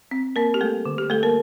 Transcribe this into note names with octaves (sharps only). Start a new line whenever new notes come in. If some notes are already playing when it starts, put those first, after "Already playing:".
C4
A#3 C4 A#4
G4
G3 A3 A4
D3
G4
G3 A3 A4
A#3 A#4